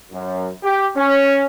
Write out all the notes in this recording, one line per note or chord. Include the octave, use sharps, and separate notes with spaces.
F#2
G4
C#4